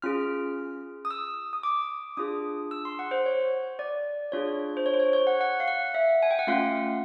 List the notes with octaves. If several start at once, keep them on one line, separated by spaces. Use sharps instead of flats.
C#4 F4 G#4 F6
D#6
E6
D#6
D6
D4 F4 G#4 D#6
E6
C6
F#5
C5
C#5
D5
D4 F4 G#4 C#5
C5
C#5
C5
C#5
C#5
F#5
F#5
F5
F#5
E5
G#5
G5
F#5
A3 C#4 F4 F5